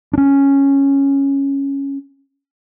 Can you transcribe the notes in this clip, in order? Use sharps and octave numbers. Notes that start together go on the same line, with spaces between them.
C#4 D4